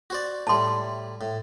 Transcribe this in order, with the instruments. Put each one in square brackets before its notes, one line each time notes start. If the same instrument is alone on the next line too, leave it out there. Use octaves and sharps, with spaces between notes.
[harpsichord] F#4 C5 D5
[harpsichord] A2 G3 [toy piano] A5 C6
[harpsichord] A2